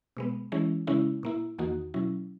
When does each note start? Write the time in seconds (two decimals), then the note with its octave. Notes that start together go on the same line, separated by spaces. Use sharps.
0.17 B2 G#3 B3
0.52 E3 G#3 C#4 E4
0.87 C#3 G#3 C#4 E4
1.23 A#2 A#3 E4
1.58 E2 D#3 A#3 D#4 F#4
1.94 B2 F#3 C#4 E4